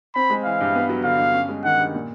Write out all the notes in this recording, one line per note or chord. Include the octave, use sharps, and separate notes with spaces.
C4 B5
G#3
E3 F5
G2
B3
F#3
D3 F5
G2
C#4
G#3
D#3 F#5
G2
A#2